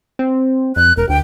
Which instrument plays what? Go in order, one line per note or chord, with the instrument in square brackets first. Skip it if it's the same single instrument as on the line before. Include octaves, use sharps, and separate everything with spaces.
[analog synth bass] C4
[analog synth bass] F2 [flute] F#6
[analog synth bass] E1 [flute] A#4
[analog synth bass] D2 [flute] G5